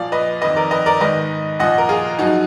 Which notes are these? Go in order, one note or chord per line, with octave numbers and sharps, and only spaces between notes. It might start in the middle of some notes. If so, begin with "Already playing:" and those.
Already playing: A#2 F3 D5 F5
B4 D#5
F2 D#3 B4 D#5
A#4 D5
B4 D#5
A#4 D5
G#2 D#3 B4 D#5
A#2 F3 D#5 F#5
A#4
F4 G#4
F#2 F3 D#4 F#4